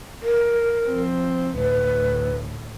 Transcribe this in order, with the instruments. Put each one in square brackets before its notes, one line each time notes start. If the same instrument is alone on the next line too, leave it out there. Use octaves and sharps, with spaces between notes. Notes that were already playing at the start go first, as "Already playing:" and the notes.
[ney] A#4
[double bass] F3 C4
[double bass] D2 A2 [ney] B4